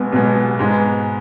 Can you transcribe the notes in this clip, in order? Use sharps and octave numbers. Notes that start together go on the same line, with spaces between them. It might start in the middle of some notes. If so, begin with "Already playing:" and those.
Already playing: B1 B2 G#3 B3
B1 B2 G#3 B3
G#2 G#3 B3